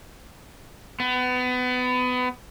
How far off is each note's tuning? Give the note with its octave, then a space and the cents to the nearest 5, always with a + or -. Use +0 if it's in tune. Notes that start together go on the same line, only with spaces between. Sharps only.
B3 +25